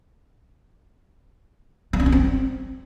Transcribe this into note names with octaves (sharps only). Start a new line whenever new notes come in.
G3
C#4
D4
C4